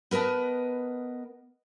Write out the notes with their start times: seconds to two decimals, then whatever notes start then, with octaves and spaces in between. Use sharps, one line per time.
0.11 B3 A#4 B4 D#5 A5